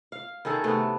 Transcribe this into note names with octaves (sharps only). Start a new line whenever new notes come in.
F5
D#3 E4 G#4 A4
C3 A3 B3